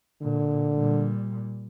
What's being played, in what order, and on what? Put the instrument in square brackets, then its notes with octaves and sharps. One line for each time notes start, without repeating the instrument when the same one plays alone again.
[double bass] A#2 [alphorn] D3
[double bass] A#2 G3